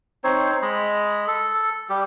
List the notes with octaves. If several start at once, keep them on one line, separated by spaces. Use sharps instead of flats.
C4 D#4 C5 C#5
G#3 D#5 B5
A4
G3 G4